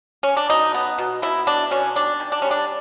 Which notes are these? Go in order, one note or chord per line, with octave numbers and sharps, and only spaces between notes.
C#4
D4
B2 D#4
B3
B2
B2 E4
B2 D4
B2 C#4
D#3 D4
D#3
D4
G3 C#4
D4